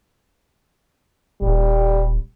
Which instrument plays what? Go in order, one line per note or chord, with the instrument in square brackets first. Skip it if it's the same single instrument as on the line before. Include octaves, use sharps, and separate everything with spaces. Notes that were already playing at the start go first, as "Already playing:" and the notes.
[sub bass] D#1 [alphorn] G3